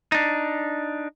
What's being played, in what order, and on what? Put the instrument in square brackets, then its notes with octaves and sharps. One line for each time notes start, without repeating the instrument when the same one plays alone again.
[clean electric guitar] D4 D#4